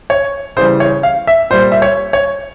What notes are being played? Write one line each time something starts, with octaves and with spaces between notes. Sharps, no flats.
C#5
C#3 E3 G3 C5
C#5
F5
E5
A#2 G3 C5
E5
C#5
C#5